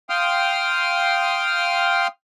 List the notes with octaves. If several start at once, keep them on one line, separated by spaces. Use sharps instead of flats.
F5 G5 C6 D#6 F6